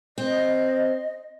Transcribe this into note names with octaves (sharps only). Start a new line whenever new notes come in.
C4 D#5